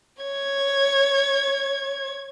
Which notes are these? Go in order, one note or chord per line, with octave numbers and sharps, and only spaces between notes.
C#5 G#6